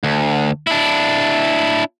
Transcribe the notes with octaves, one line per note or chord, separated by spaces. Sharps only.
D2
D4 E4